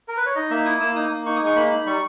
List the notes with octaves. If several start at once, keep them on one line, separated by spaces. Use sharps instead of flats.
A#4
B4
C#5
D#4 D#5
A#3 E5
E4 D#6
A#3 E6
D#4 D#6
A#3
D#4 C#6
G#3 D#6
C#6
A#3 B5
D#4
G3 C#6